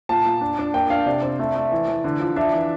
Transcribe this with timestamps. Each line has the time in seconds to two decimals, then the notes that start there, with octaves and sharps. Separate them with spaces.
0.09 A#2 A5
0.25 A#2
0.41 D4
0.58 D4
0.74 A#3 G5
0.90 D4 F5
1.06 C3 D5
1.22 C4
1.39 A3
1.56 A3
1.72 E3
1.88 E3
2.04 D3
2.20 F3
2.36 D4 E5
2.53 E3